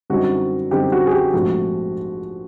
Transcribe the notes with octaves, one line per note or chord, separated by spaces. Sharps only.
F#2 D3 G3 C4 D#4 F#4
F#2 D3 G3 C4 D#4 G4
F#4
G#4
G4
A#1 G#2 F3 A3 C4 F#4